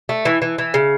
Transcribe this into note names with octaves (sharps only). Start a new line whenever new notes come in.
A3
E3
E3
E3
C#3